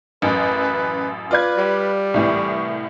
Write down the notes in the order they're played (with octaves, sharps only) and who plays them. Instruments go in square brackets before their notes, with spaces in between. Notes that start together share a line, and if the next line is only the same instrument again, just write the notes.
[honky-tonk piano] A1 F#2 [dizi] B4
[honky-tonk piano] F4 D5 G#6 [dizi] B4
[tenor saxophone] G3
[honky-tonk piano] C2 A2 E3 [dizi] C#6